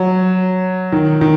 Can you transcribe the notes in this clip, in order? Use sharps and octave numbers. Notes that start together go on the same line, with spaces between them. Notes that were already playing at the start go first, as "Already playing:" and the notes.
Already playing: F#3
D#3
D#3